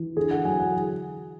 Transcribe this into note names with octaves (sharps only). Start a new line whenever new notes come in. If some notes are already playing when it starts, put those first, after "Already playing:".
Already playing: E3
D3 G#4
F#5
F#3 G#5
F#5